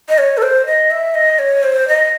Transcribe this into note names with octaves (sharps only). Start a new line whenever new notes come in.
D#5
C#5
A4
C5
D#5
E5
D#5
C#5
C5
D#5